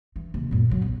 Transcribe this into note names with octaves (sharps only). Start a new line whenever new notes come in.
E3
D#2 C3
F#2 A#2
C#3 F#3
B1